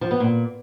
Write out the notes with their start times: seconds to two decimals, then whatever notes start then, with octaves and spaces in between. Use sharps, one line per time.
0.01 F3
0.11 B3
0.20 A#2